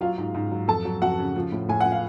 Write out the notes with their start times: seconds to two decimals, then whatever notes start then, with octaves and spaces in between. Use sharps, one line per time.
0.01 F#3 F4 F5
0.18 G#2
0.34 G#2
0.52 F#3
0.68 F2 A4 A5
0.85 F#3
1.02 F2 F#4 F#5
1.19 C#3
1.36 F3
1.52 A2
1.69 A2 G#5
1.81 F#5
1.86 F3
1.92 F5